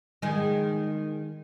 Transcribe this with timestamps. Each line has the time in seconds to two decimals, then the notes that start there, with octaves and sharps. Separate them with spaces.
0.22 D#3 G#3